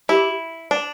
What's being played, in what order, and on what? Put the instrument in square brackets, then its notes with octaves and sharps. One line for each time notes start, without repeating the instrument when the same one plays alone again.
[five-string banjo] E4 [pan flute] G4
[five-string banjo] D4